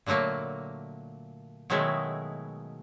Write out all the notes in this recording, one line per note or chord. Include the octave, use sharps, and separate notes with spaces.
A#2 D3 F#3 A3 A#3
B2 D#3 F#3 G#3 A3 E4